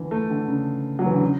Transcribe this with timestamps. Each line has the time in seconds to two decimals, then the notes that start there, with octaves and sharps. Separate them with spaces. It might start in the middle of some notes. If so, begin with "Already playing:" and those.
Already playing: D3 E3
0.11 A3
0.30 D3
0.48 C#3
0.99 F#3
1.06 E3
1.13 D3
1.21 C#3